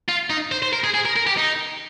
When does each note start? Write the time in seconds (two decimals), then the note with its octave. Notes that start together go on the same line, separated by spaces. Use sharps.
0.08 F4
0.30 D#4
0.52 C5
0.63 C5
0.73 A#4
0.84 G#4
0.94 G#4
1.05 A#4
1.16 A#4
1.27 G4
1.38 D#4